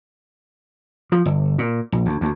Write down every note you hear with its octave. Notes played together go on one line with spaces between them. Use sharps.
F3
G1
A#2
A#1
D2
D2